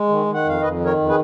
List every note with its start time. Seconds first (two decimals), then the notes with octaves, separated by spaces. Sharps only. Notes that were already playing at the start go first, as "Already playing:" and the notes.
Already playing: G#3
0.09 D#3
0.26 D#3
0.34 F#5
0.44 F2 F5
0.62 F2 B4 D#5
0.79 D#3
0.85 A#4 C#5
0.97 F2
1.09 G#4 B4